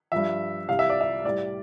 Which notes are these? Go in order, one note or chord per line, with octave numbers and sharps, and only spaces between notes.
G2 F3 E5
C2 C3 G3 F5
E5
D5
E5
A2 G3 D5